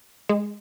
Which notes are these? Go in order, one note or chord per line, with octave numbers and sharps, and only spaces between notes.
G#3